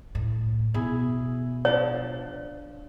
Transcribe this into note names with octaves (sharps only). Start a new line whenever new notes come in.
A2
B2 E4 G#4
F3 D4 C#5